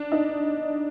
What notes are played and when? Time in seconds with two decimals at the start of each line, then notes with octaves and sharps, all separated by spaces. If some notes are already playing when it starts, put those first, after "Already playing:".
Already playing: D4
0.12 D#4